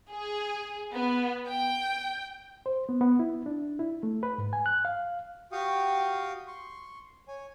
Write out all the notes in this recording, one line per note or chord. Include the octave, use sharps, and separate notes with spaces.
G#4
B3
G5
C5
B3
B3
E4
D4
E4
A3
B4
G#2
G#5
F#6
F5
F#4 G4 F5 G5 C#6 D#6
C6 C#6
C#5 G#5